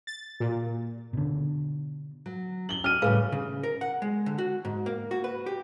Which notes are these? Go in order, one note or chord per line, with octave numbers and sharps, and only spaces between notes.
A6
A#2
B2 D3
F#3
F#7 G7
D5 F6 D#7
A2 C#3 G3 G#4 B4 F5
C#3
A#4
F#5
G#3
D3
F#4
G#2
A#3
F#4
B4
G4